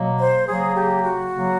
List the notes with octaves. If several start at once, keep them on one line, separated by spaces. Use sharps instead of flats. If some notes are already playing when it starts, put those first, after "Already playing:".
Already playing: B2 F#3 A#3
C5
C#3 F#3 A#3 G#4
G4
F#4
C#3 F#3 A#3